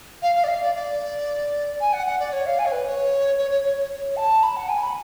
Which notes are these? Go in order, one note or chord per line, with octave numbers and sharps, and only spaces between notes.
F5
F5
D5
F5
D5
D5
G#5
F#5
F#5
D5
C#5
F5
G#5
C#5
B4
C#5
C#5
C#5
C#5
C#5
C#5
A5
B5
F#5
G#5
B5